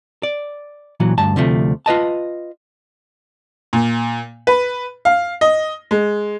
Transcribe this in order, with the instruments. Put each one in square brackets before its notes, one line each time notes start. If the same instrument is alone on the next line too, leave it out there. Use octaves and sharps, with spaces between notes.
[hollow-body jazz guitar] D5
A#2 E3 F#3
D2 G2 A5
D2 C3 F3 A3
F4 B4 D#5 A5
[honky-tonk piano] A#2
B4
F5
D#5
G#3